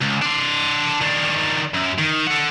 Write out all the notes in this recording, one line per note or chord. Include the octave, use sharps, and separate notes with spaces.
C#2
D4 C6
D#3 D4
F#2
D#3
A4 F#5